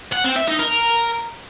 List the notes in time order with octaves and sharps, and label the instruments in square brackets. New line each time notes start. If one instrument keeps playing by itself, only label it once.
[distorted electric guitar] F#5
C4
E5
D#4
A#4